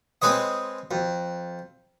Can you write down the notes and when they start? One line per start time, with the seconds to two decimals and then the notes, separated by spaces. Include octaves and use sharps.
0.22 G#3 C4 B4 C#5 D#5
0.91 F2